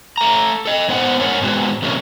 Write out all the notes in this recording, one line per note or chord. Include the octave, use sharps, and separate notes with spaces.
A3 A#5
A4 D#5
G#2 B3 C5 F#5
G#2 A#4 C#5 F#5
G#2 G#3 B3 F#4
C3 F#3 A3 A#3 C4 C#4